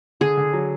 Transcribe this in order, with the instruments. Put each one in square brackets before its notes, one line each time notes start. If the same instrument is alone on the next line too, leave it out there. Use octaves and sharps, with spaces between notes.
[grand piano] D3 [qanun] G#4
[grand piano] D3
F#3